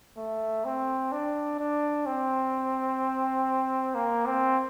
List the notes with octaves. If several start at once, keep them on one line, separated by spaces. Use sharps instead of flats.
A3
C4
D4
D4
C4
A#3
C4